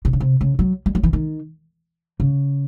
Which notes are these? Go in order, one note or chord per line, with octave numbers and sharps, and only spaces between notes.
C3
C#3
C3
C#3
F#3
G3
F#3
E3
D#3
C#3